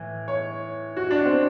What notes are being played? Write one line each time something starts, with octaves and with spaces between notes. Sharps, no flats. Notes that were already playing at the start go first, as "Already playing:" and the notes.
Already playing: A2 E3
C#5
F#4
D4
C4